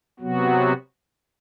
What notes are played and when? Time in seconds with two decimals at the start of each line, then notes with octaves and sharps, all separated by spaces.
0.20 C3 F#3 B3 F#4